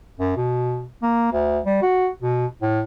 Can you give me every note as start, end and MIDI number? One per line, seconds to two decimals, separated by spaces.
0.19 0.33 42
0.37 0.87 47
1.02 1.28 58
1.32 1.59 38
1.65 1.80 55
1.82 2.09 66
2.22 2.46 47
2.62 2.82 45